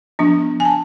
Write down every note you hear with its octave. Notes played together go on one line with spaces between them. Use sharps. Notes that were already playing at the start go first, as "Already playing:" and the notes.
F3 B3 D4
G#5
A5